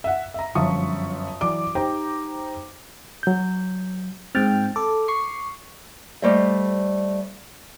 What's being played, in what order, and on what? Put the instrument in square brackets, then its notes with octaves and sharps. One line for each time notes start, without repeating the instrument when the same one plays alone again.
[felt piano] E5 F#5
E5 A#5
G1 F#2 F3 E5 C#6 D#6
E3 F#3 D5 D6
D#4 G4 C5 G5 A#5
[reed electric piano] F#3 G6
[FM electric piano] G#2 G5 F6 [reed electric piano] C4 A6
[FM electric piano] A4 [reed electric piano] D6
[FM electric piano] C#6 C7
[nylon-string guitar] G3 A3 C5 D#5 E5